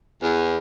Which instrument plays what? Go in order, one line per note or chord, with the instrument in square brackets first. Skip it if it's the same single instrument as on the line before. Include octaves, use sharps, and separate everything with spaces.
[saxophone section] E2